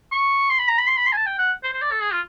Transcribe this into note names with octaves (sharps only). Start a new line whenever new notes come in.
C#6
C6
B5
A#5
B5
C6
B5
C6
G#5
A5
G5
F#5
C5
C5
D5
A4
G#4
F4